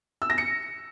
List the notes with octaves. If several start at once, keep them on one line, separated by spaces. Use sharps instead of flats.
E6
A#6
C#7